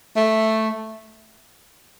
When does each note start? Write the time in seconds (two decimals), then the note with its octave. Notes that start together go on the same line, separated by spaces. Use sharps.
0.16 A3